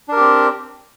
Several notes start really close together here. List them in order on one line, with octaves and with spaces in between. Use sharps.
D4 A#4 G4 C4